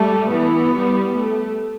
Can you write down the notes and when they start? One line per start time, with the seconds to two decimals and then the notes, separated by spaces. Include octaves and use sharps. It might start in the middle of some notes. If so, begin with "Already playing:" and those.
Already playing: G3 A3
0.31 E3 B3
0.74 G3
1.15 A3